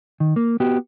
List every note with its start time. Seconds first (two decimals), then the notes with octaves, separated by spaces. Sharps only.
0.20 D#3
0.36 A#3
0.60 B3 F#4 G4